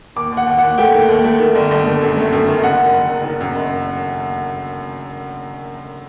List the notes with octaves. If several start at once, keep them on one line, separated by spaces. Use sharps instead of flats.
D#2 D6
D#2
F#5
D#2
D#2 F#5
A3 G5
D#3
D#2
A3
D#3
G1
G1
A3
F#2
A3
F#2
D#3
F#1 F#5
D#3
F#1
F#1
D#3
F#2
F#1